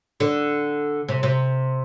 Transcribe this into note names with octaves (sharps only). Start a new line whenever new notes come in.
D3
C3
C3